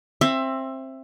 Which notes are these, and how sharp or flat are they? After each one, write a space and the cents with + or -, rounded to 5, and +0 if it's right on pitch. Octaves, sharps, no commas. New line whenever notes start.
C4 +20 E5 +15